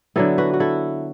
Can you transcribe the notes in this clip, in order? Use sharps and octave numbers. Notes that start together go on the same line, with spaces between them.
D3 F#3 B3 E4 A4
F#4 B4
F#4
E4 A4